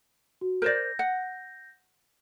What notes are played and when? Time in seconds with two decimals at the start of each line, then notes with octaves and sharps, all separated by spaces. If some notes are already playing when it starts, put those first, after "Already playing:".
0.41 F#4
0.62 A#4 C5 D5 G6 A#6
0.99 F#5